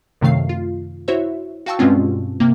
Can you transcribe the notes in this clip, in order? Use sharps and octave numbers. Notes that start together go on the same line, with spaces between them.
F#2 C3 D#3 A3 F5 C7
F4
E4 F#4 C5 C#5 E5
F#4 F5 G5 A5 C#6 E6
G2 B2 G#3 C4 C#4 F4
C3 A#3